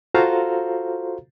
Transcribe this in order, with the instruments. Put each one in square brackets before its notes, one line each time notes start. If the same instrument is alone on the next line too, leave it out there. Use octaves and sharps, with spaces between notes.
[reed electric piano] F4 F#4 A4 C5 F5 A#5